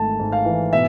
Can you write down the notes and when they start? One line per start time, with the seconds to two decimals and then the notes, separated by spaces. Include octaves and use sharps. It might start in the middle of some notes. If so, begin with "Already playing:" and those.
Already playing: G#1 G#2 E3 A3 A5
0.19 G#2
0.32 F5
0.45 E3
0.73 B2 E5